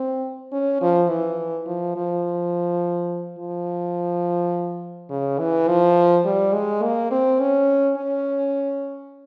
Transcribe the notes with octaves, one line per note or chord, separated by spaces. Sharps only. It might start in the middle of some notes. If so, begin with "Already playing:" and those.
Already playing: C4
C#4
F3
E3
F3
F3
F3
C#3
E3
F3
G3
G#3
A#3
C4
C#4
C#4